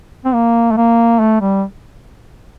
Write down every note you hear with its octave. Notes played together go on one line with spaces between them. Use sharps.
C4
A#3
A3
A#3
A3
G3